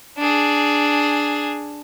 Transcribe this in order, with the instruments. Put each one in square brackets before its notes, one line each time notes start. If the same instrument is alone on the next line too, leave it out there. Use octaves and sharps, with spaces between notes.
[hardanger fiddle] D4 G#4